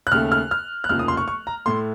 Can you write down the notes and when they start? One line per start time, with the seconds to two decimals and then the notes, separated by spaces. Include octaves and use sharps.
0.07 F#6
0.12 D#2 C#3 A3 F6
0.32 F6
0.51 F6
0.84 F#6
0.89 F1 D#2 C#3 F3 A#3 F6
0.99 D#6
1.08 C6
1.17 C#6
1.28 C#6
1.47 A#5
1.66 A2 A3 C6